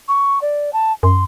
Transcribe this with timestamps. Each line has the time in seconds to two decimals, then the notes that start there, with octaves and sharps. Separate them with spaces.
0.08 C#6
0.42 D5
0.73 A5
1.03 F#2 C6